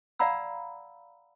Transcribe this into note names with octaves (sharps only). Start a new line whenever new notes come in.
D5 F5 F#5 A#5 B5 E6